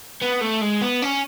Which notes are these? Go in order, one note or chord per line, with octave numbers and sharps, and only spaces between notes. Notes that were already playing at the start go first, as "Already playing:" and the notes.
B3
A3
G#3
B3
C#4